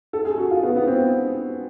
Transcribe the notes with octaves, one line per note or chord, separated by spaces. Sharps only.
A4
G#4
F#4
F4
B3
B3
C4